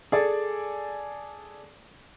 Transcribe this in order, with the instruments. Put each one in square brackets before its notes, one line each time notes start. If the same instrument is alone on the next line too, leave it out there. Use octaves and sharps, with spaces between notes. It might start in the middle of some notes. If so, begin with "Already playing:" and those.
[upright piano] G#4 A4 D5